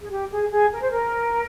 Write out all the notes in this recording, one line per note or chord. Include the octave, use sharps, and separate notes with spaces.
G#4
G4
G#4
G#4
A#4
C5
A#4